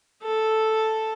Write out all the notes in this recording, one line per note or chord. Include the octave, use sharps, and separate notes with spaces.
A4